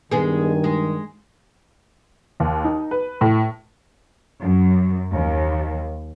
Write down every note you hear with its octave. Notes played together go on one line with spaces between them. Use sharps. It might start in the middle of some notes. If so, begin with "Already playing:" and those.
G2 D#3 G#3 B3 G#4 G#5
G#3
D#2
D#4
B4
A2
F#2
D#2